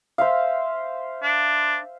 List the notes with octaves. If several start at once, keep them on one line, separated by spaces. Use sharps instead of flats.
C5 E5 F5
D4